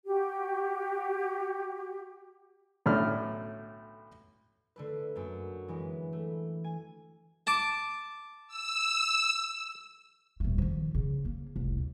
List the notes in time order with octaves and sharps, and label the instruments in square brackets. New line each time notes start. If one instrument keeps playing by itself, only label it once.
[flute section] F#4 G4
[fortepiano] B1 A2 D3 C#4 D5 F6
[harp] D3 A3 B4
F#2 A#3
E3 G#3 B4
A3
G#5
[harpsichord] A5 D6
[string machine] E6
[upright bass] D#1 A3
D#3 F3
C#3
A#3
F1 C2
D2